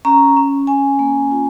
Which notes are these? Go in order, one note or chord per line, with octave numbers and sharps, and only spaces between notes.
C#4 A#5
C#4
C#4 G#5
A#3
F4